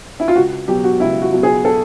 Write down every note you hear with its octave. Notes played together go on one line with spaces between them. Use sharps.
E4
F4
C#2 F#4
B2 F#3 G4
F#4
C#2 E4
F#4
B2 F#3
G#4
A4